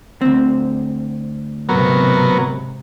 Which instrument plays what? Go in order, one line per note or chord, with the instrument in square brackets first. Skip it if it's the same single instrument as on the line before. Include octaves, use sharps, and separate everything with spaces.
[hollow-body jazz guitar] D2 C4
[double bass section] G#2 C3 [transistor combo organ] F#3 B3 A#4